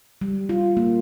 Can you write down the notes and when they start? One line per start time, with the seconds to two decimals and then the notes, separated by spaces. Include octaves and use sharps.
0.21 G3
0.49 F4
0.77 A#3